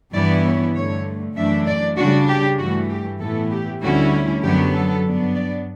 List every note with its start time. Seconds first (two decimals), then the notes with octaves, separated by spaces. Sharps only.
0.13 G2 E3 B3 E4 D5
0.44 C#5
0.74 G2 D3 A3 C#5
1.36 F#2 E3 A3 D4 E5
1.66 D5
1.97 C#3 G3 D4 F#4
2.29 G4
2.58 G2 E3 A3 F#4
2.90 G4
3.20 A2 E3 B3 E4 A4
3.51 G4
3.81 D2 D3 G3 C#4 E4 F#4
4.42 F#2 D3 F#3 B3 G4
4.73 A4
5.04 G2 F#3 B3 D4
5.35 D5